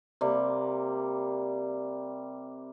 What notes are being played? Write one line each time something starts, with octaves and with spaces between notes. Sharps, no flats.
C3 G3 A#3